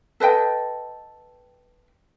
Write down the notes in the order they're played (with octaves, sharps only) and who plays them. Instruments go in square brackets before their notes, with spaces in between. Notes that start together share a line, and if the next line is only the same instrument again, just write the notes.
[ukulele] A4 B4 D#5 G5